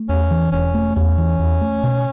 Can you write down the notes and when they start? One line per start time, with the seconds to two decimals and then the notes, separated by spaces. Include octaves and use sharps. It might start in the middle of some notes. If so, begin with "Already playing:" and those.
Already playing: A3
0.09 E2 C#4
0.31 E3
0.52 E1 C#4
0.74 A3
0.96 E2 C#4
1.18 E3
1.39 E2
1.61 A3
1.83 B2